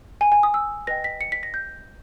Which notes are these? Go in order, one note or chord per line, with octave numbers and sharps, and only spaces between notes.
G#5
G#5
D#6
E6
B4 D#5 G5 A#6
B6
C#7
B6
A#6
G6